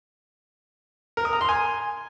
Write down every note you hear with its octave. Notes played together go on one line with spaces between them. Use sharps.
A#4
D#6
A#5
C6
G#5